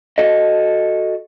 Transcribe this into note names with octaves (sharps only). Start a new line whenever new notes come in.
F#4 A4 D#5